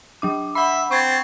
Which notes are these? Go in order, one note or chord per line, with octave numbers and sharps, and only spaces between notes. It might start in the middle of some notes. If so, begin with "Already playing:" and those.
F#3 D4 D6
E5 F#5 B5
C4 C#6 G#6 A6